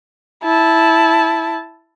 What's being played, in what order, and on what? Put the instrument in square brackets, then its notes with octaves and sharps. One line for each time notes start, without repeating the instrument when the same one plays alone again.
[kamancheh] E4 A5